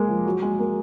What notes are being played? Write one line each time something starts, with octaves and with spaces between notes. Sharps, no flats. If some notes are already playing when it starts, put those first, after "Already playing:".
Already playing: G#3 A#3
F3
F#3
G#3
A#3